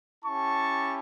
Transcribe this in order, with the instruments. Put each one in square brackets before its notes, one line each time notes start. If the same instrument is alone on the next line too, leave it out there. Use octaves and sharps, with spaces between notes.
[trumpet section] C#4 E4 G4 A5 C#6